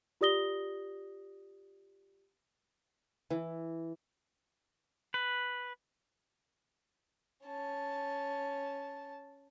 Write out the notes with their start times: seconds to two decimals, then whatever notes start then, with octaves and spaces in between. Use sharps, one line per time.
0.21 F4 G4 D5 D#6 A#6 G7
3.30 E3
5.14 B4
7.45 C#4 A5